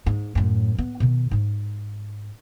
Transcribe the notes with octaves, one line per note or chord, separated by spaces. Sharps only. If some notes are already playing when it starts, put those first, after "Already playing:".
G#2
F#2 A2
B3
B2 D#3
G#2 D#4